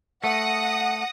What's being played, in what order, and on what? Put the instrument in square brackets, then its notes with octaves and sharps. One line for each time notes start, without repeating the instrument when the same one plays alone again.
[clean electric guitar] A3 [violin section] F#5 D#6 A#6